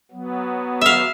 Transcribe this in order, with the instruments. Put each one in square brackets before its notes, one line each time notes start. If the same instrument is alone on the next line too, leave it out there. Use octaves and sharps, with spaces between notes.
[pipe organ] F#3 B3
[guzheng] E5 F5